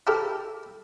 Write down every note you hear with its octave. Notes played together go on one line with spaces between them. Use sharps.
E4 G4 A4 A#4